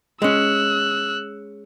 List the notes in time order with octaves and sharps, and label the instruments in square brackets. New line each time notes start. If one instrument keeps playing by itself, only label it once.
[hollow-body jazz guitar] G#3 C#4 [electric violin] E6 F#6